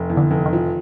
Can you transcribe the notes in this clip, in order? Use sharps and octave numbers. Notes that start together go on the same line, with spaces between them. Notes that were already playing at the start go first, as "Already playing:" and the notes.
Already playing: F1
E2
D3
F1
D#3
F3